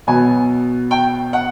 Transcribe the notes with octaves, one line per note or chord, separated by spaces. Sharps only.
B2 F#3 B3 G#5
G5
F#5